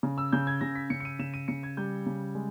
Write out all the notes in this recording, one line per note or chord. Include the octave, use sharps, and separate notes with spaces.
C#3
E6
C#3 G6
G#6
C#3 A#6
B6
C#3 C#7
C#7
D#7
C#3 E7
D#7
C#3 C#7
G#6
G3 G6
C#3
G#3